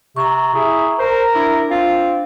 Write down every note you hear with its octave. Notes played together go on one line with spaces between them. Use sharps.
C3 A#5 C#6
E4 G#4
A#4 C5
D4 E4
C4 F4